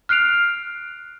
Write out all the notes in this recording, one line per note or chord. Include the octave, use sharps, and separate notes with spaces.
F6 F#6 C7 D7 F7